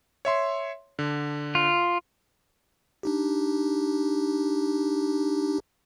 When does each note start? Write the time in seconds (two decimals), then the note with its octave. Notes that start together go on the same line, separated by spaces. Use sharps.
0.25 C#5 E5 C6
0.99 D3
1.55 F4
3.03 D4 D#4 G4